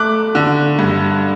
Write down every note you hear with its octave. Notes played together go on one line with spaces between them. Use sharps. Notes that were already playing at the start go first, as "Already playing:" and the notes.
Already playing: A3 D6 F#6
D3
G2